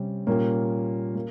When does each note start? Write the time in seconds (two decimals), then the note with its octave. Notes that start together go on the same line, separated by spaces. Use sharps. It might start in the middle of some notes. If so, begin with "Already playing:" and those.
Already playing: C3 G3 C#4
0.27 A#2 G3 A#3 C#4
1.15 A#3